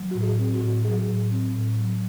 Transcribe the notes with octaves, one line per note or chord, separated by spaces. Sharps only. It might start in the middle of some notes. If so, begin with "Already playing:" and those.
Already playing: F#3
A2 F#4
G#4
C4
F#4
A2
F#3 G#4
A2
C4
A2
F#3